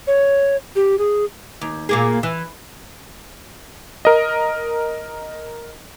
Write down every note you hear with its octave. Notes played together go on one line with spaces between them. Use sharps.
C#5
G4
G#4
D#2
A#2 A#3 G#4
E3
A#4 D#5